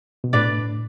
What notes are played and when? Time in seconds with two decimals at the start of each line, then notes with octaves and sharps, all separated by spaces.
0.24 B2
0.33 A2 D4 B4 D5